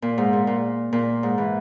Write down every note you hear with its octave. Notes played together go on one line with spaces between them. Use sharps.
A#2
G#2
A#2
A#2
A#2
G#2
E3